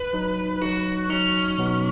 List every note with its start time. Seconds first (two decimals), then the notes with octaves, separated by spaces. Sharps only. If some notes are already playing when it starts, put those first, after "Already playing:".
Already playing: B4
0.13 F#3 D#4
0.61 F#3 D#4 F#4
1.10 F#3 C#4 D#4
1.58 B2 F#3 B3 D#4